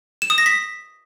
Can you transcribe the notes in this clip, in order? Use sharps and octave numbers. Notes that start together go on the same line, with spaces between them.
E7
D#6
A#6
B6